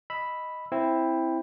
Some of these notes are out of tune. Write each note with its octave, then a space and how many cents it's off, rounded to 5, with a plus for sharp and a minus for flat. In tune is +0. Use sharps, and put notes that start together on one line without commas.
D#5 +0 B5 +0 E6 +0
C4 +10 E4 +0